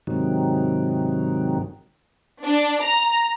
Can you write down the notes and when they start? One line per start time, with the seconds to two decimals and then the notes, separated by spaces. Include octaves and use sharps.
0.07 G#2 C3 D#3 F#3
2.46 D4
2.82 A#5